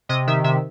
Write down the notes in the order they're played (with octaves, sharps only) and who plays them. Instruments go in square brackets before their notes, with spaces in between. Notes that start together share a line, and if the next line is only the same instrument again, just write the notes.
[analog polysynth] C3 D#5
D#3 E5
C3 E5